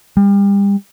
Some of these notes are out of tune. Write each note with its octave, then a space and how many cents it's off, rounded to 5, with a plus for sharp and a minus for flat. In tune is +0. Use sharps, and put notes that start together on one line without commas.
G3 +35